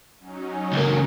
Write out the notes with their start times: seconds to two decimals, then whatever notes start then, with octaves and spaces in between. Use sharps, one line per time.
0.19 F#3 C#4 D#4
0.73 C#2 A#3